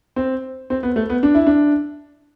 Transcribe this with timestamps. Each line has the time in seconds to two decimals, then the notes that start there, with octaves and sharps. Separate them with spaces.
0.16 C4
0.70 C4
0.83 B3
0.96 A3
1.10 B3
1.23 D4
1.35 E4
1.46 D4